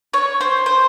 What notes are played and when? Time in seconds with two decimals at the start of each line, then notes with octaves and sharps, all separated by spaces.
0.13 C#5
0.41 C5
0.66 C5